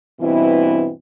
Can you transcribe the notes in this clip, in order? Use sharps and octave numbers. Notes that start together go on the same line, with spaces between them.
G2 B2 E3 C4 E4